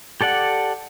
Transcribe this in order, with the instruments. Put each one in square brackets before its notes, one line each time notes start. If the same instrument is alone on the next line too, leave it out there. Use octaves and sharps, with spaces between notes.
[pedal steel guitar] G4 A4 D5 F#5